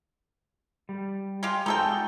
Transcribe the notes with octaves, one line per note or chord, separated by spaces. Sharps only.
G3
G#3 F4 G4
G#3 D#4 F4 F#4 A4 G5